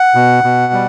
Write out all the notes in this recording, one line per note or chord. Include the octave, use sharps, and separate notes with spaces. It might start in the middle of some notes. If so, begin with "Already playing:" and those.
Already playing: F#5
B2
B2
G3